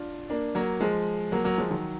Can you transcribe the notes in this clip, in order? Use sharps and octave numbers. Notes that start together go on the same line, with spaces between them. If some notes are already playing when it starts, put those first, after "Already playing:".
Already playing: D4 F4
A#3 D4
F#3 A#3
F3 G#3
F#3 A#3
F#3 A#3
F3 G#3
D#3 F#3